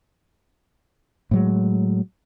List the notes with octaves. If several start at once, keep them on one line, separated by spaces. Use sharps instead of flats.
A2 F#3 G#3